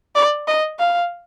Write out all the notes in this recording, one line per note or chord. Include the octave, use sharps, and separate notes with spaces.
D5
D#5
F5